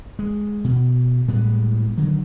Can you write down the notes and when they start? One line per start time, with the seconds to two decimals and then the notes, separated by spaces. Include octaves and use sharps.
0.19 G#3
0.64 B2
1.28 A2 G3 G#3 B3
1.98 D3 D#3 F#3